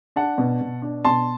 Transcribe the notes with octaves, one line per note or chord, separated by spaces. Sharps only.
D4 F#5 A5
B2
B2
D4
B2 A5 C6